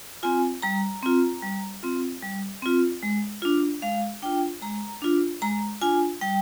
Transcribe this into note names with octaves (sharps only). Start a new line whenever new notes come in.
C4 F4 G#5
G3 A#5
C4 F4
G3
C4 F4
G3
C4 F4
G#3
D4 F4
G#3 F5
D4 F4 G5
G#3 A#5
D4 F4
G#3 A#5
D4 F4 G#5
G3 G5